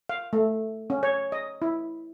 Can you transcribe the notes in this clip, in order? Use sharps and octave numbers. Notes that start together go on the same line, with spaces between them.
F5
A3
C#4
C#5
D#5
E4